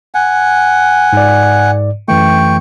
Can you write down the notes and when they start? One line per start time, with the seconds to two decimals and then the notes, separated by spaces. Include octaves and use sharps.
0.15 F#5 G#5
1.13 G#2 D5
2.08 F#2 E3 A3 G5 C#6